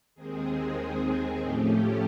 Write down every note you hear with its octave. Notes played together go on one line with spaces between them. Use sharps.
D#2 D#3 G#3 C4 G#4
A2 F3 A3 C#4 G4